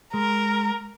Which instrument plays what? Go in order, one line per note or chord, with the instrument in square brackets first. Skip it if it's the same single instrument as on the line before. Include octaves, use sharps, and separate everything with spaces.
[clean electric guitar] G#3 [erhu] A#4